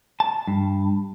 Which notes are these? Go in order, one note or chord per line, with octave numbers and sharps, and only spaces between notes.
A5
G2